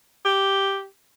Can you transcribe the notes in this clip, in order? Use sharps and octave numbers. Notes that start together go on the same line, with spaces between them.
G4